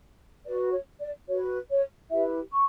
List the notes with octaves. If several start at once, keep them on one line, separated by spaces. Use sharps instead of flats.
F#4 B4 D5
C#5
D5
F#4 B4 C#5
C#5
E4 G4 B4 E5
C#6